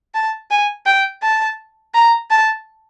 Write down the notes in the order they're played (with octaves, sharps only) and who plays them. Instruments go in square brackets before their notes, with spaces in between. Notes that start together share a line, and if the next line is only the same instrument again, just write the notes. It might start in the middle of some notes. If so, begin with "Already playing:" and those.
[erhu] A5
G#5
G5
A5
A#5
A5